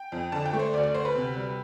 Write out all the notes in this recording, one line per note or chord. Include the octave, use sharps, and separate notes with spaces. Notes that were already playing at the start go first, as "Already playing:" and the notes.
Already playing: G5
F2
D3 A5
G5
A3
C5
D2 D5
D5
D2 C5
B4
C3
G3